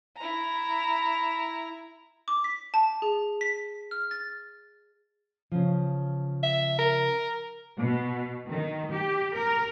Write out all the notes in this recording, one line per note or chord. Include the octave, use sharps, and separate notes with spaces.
E4 A#5
D6
B6
A5
G#4
B6
F6
A6
C#3 F3
E5
A#4
B2
D#3
G4
A#4